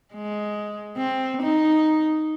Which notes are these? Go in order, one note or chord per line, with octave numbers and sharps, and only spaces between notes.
G#3
C4
D#4